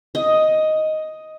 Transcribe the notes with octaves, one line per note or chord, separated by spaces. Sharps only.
D#5